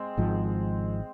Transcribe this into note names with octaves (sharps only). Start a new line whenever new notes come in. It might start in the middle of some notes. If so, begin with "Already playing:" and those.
Already playing: G#3 C4
G#1 G#2 F3